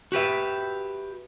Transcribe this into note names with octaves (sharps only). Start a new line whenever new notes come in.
F#4 G4 B4 E5